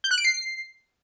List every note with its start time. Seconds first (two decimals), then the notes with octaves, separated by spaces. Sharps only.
0.04 G6
0.11 F#6
0.18 D7
0.25 C7